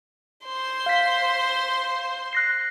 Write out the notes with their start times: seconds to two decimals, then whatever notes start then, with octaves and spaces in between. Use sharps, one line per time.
0.46 C5 C6
0.86 F5 B6
2.33 F#6 A#6 C7